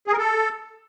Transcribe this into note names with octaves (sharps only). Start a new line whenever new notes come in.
G#4
A#4
A4